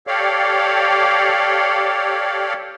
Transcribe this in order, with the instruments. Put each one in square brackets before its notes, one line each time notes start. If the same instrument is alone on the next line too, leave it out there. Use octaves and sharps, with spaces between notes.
[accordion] G4 A4 C#5 D5 F5